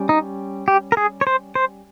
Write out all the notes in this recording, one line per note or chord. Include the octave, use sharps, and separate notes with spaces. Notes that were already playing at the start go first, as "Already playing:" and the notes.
Already playing: G3 C#4
D#4
G4
A#4
G#4
C#5
C5
C5